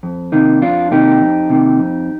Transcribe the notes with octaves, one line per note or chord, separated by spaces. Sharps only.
F2
C3 D#3 A#3 D#4
F2 D4 F4
C3 D#3 A#3 D#4 G4
F2
C3 D#3 A#3
F2